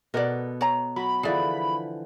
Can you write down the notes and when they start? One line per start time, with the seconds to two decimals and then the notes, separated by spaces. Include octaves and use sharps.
0.14 B2 B3 A4 A#4 D5
0.61 C#5 A#5
0.96 F#3 B5
1.23 D3 E3 F3 G#4 D5